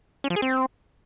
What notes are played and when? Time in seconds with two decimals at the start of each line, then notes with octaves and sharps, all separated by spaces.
0.24 C#4
0.30 F3
0.36 G#4
0.42 C4